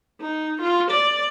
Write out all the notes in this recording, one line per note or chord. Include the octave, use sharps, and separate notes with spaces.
D#4
F4
D5